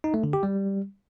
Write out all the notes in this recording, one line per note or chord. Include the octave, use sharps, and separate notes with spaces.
D#4
A3
D3
G4
G3